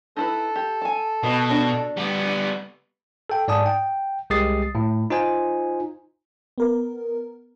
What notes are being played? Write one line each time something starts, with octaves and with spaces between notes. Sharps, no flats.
D#4 E4 A4 B4
G4
G#5 A5
B2 B3 B5
D4 F#4 D5
G3 B3
A4 G5
G#2 D5 G#5 A5 D#6
G5
C2 G#3 G4 D#6 A6 C7
A2
D#4 F4 C5 G#5
B3 A#4